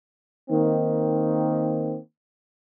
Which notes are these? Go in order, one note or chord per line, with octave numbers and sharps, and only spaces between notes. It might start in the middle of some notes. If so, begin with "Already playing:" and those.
D#3 A#3 C4 D#4